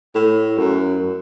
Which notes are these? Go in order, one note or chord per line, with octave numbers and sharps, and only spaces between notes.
A2
F#2